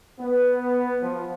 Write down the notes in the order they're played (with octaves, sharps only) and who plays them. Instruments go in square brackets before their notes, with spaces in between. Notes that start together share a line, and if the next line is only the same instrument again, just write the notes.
[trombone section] B3
F3